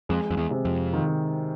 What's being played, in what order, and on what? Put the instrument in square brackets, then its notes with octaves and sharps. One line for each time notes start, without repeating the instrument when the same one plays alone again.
[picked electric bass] F2 [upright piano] G#3
[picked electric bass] F2
E2
[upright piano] C3
[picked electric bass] F2
[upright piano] D#3